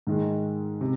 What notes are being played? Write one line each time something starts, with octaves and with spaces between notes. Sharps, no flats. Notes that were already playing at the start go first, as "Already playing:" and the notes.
G#2 D#3 G#3
C3